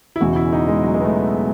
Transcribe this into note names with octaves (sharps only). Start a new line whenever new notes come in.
E4
E1 E2 C#3 E3 F#4
E4
D#4
G#3
F#3
G#3
B3
A3